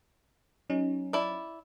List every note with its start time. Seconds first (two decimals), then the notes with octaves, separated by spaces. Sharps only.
0.70 F#3 C#4 D#4
1.13 E4 D5